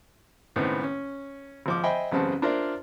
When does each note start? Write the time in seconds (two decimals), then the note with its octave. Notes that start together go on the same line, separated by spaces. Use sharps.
0.56 C#2 A2 D#3 B3 C4
0.83 C#4
1.66 G#1 F3 D6
1.84 C5 D#5 E5 G5 G#5 B5
2.12 A1 F#2 C#3 B3 C4 A5
2.42 D4 F4 A#4 C5 D5 E5